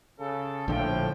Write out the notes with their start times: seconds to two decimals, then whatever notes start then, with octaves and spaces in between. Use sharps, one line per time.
0.19 C#3 A4
0.68 A#1 A2 D3 F3 G5